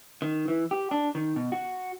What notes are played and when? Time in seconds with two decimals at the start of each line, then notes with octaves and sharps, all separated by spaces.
0.22 D#3
0.48 E3
0.71 G4
0.91 D4
1.15 D#3
1.36 B2
1.52 F#4